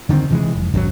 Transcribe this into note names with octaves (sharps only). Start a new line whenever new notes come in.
D3 D#3 G3 C4
C3 E3 G3 G#3
F1
G#1 F#2 D3 F#3